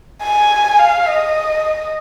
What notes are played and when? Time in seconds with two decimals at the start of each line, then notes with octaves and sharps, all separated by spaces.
0.23 G#5
0.79 F5
1.08 D#5